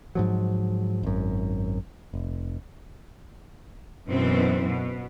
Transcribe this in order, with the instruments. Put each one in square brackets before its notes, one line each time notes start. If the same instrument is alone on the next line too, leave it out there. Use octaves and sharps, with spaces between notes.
[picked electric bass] G#2 F3 F#3
G#1 F#2
F1
[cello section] F#2 B2 E3 C4
B2